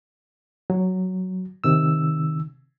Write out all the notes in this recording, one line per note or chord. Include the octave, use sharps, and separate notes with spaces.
F#3
C3 D#3 E6